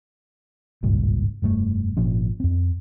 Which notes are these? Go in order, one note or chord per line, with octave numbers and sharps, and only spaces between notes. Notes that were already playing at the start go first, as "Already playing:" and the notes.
G#1 C#2 G2 A#2
F1 G2 B2 A3
G#1 A#2 F3 C#4
F2 C4